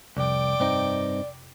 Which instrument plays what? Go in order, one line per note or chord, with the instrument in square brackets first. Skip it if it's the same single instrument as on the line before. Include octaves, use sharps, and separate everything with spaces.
[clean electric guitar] C2 [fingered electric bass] F2 C3 F3 [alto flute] D5 [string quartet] G5 D6
[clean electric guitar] G2 C4 D#4